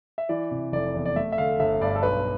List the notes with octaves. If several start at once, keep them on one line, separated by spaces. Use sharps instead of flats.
E5
E3 D5
C3
F1 D5
E2
D5
A3 E5
E5
D3 F5
G1 E5
G2 D5
A4
B1 B4